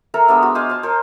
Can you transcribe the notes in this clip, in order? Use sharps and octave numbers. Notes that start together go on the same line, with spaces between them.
A4 A#4 E5 A#5
G#3 B3 D4 E5
F#4
C5 D#5 F5 G#5
C5 A5
A#4 C5